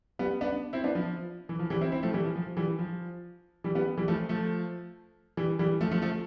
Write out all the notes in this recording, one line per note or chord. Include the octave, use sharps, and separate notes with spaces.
G3 B3
B3 D4
C4 E4
B3 D4
F3
E3
F3
E3 G3
C4 E4
C4 E4
F3 A3
E3 G3
F3
F3
E3 G3
F3
E3 G3
G3 B3
E3 G3
F3 A3
F3 A3
E3 G3
E3 G3
F3 A3
F3 A3
F3 A3